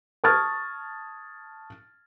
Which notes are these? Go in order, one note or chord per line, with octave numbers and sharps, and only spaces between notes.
A5 C#6 D#6 F6 G#6 A6